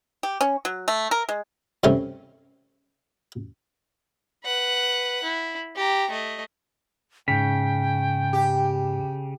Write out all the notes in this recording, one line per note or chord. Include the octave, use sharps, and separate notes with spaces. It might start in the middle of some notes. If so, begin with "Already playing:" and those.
G4
C#4
F#3
A3
A#4
G#3
G2 C3 A3 C#4
B4 F#5
E4
G4 A#5
A3 D#5
G#2 C#3 G5 B6
G4